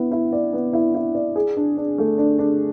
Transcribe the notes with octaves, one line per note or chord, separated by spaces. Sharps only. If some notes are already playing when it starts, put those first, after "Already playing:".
Already playing: B3 E4
E4
D5
B3
E4
E4
D5
G#4
D4
D4
A3
D4
D4